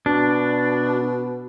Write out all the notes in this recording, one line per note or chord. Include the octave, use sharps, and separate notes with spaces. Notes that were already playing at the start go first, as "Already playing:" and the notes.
B2 D4